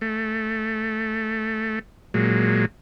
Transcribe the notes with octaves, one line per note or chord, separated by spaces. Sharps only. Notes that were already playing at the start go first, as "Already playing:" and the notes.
A3
A#2 F#3 G#3